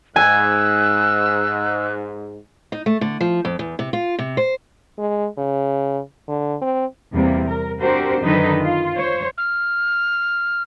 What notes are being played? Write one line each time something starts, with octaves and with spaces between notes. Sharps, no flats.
G#2 G#5 E6 F#6
D#4
A3
D3
F3
F2
E2
C3
F4
C3
C5
G#3
C#3
D3
C4
E2 C3 G3 A#3
A#4
C4 D4 F#4 G4 A#4 C5
F#2 D3 D#3 D#4 B4
F4
C5 C#5
F6